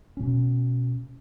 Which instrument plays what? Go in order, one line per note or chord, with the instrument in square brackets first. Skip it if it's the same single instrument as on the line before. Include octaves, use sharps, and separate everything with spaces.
[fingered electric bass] B2 C#4